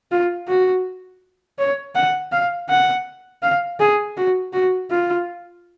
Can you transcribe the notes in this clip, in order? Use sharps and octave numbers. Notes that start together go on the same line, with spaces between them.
F4
F#4
C#5
F#5
F5
F#5
F5
G#4
F#4
F#4
F4